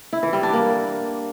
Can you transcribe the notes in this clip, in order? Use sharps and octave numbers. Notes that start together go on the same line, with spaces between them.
E4
E3
G3
D4
A#3